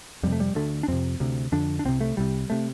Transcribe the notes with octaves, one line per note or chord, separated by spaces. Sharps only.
F2 C3 G3 A3
G3
D2 D3 A3
D4
F2 C3 C4
D2 C3
F2 D3 D4
D4
C2 C3 C4
A3
C2 C3 G3
C3 A3